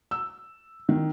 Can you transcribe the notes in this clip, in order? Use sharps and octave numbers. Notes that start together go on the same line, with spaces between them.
E6
D#3